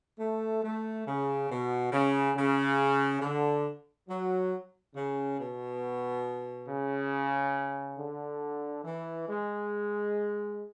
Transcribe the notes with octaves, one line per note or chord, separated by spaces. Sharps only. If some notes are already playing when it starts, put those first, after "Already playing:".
A3
A3
C#3
B2
C#3
C#3
D3
F#3
C#3
B2
C#3
D3
E3
G#3